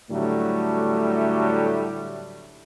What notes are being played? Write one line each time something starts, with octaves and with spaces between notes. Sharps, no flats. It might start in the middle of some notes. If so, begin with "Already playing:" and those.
A2 D3 F#3 G3 A3